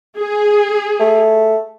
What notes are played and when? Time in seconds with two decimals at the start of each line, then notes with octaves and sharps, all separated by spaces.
0.18 G#4
1.00 A3